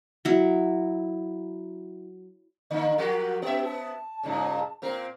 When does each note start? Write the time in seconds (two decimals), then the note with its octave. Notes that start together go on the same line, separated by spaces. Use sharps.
0.25 F#3 E4
2.70 D3 A#3
2.98 F3 F#4 G4 A#4
3.42 B3 G4 E5
3.65 A5
4.23 G2 A#2 C#3
4.82 A#2 C4 A#4